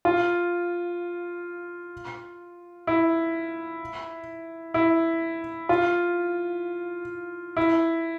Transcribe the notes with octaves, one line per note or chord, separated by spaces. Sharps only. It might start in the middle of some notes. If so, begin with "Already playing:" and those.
F4
E4
E4
F4
E4